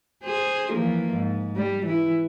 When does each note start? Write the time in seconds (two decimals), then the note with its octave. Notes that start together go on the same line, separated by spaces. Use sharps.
0.24 G#4 C5
0.72 E3 F3 A#3
1.14 G#2
1.56 G3
1.86 E3 E4